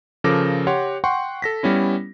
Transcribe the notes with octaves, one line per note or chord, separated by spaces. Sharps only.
C#3 F3 A4 A#4 D6 A#6
G4 C#5 F#5 C6
F#5 G5 C6 C#6
A4 A#6 B6
G3 B3 C#4 E4